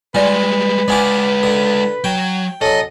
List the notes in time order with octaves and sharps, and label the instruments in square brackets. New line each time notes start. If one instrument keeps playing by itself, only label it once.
[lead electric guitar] G3 G#3 [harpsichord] F4 [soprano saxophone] B4 [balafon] D5 G#5
[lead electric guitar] G#3 F4 [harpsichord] D4 F#5 D6 [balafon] C5 G#5
[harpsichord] D3
[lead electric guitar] F#3 [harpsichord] G5
[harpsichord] F#3 C#4 [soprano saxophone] A4 [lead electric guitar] D#5